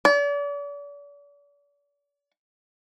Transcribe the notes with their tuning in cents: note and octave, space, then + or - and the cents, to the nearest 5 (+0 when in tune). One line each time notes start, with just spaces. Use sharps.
D5 -40